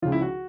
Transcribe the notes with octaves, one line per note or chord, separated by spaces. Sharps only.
C#2 C#3 F3 F4
E4
F#4